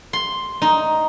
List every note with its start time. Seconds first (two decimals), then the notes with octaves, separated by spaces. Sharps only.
0.13 C6
0.62 D#4